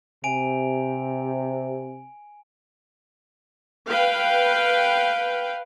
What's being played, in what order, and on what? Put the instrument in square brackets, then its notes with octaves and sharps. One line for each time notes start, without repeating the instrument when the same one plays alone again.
[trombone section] C3 [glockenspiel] G#5 D7 F7
[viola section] B4 F5 G5